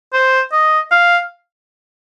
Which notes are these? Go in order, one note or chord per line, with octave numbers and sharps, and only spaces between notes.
C5
D#5
F5